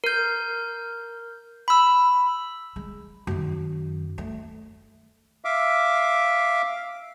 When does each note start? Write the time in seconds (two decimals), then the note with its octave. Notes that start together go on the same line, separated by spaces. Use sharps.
0.04 A#4 G6
1.68 B5 E6
2.76 G#3
3.27 F#2 D#3
4.18 A3
5.45 E5 F5 D6